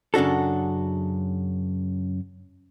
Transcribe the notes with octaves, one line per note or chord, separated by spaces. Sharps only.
F#2 C#3 D4 F#4 A4